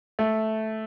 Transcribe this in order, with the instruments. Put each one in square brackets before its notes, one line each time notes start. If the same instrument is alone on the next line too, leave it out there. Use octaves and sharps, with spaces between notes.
[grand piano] A3